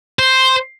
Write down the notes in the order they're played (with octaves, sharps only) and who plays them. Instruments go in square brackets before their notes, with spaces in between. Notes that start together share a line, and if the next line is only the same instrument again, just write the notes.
[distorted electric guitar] C5